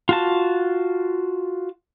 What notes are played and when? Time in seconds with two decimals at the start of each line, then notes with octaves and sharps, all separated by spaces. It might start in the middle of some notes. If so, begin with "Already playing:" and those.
0.09 F4 F#4 A5